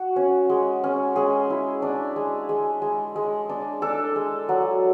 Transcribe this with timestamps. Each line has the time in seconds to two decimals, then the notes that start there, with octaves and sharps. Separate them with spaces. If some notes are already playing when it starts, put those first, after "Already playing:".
Already playing: F#4
0.16 C#4
0.50 G#3
0.84 C#4
1.16 G#3 G#4
1.50 E4
1.82 D4
2.16 G#3
2.49 G#3
2.82 G#3
3.16 G#3
3.49 D4
3.82 D4 A4
4.16 G#3
4.49 F#3